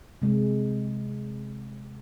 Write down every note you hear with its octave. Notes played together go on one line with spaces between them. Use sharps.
C3 G#3